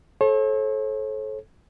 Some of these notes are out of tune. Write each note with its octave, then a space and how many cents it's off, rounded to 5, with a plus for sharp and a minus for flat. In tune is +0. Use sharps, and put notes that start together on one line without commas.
A4 -25 C#5 -45